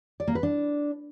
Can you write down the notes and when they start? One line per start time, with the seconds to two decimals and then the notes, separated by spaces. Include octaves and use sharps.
0.20 D5
0.28 A#3
0.35 B4
0.43 D4